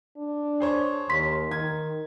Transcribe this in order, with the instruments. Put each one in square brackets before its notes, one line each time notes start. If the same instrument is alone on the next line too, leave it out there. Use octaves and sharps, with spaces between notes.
[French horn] D4
[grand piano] G#4 C5 C#5
[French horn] D#2 [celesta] C6 B6
[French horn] D#3 [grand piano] G#6